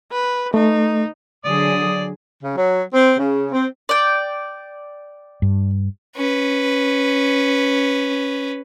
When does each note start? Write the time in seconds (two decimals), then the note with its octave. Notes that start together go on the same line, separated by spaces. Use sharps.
0.12 B4
0.54 A3 D#4
1.45 D3 F#3 G#4 D5 D#6
2.43 C#3
2.56 F#3
2.93 C4
3.18 C#3
3.52 C4
3.89 D5 G5
5.42 G2
6.16 C#4 B4